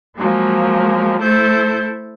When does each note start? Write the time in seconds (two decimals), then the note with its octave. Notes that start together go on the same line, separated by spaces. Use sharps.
0.17 F3 F#3 G#3 A#3
1.22 A3 E4 A4 C5 G6